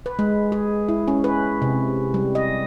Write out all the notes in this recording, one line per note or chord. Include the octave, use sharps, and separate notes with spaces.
B4
G#3
G#4
E4
C#4
B4
C3
G3
D#5